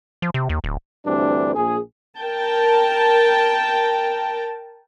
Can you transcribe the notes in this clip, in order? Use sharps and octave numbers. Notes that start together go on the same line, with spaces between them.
F3
C3
D#2
D1
D2 G2 D3 E3 C4 D4
A#1 G#4
A#4 G5 A5